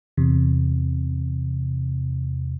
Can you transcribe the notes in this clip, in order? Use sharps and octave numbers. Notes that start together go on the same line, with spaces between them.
E2 C3